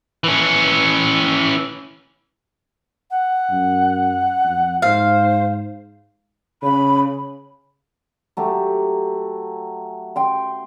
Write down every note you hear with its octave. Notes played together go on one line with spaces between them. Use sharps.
E3 C#4
F#5
F#2
F2
G#2 C5 F5
C#3 B5
F#3 A3 G4
G5 C6